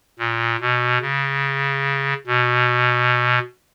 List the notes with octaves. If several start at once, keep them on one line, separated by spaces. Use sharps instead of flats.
A#2
B2
C#3
B2